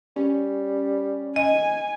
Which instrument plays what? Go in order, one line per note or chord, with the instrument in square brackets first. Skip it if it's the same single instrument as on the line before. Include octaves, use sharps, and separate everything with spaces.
[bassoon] G3 [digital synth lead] C#4
[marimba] D#5 [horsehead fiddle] G#5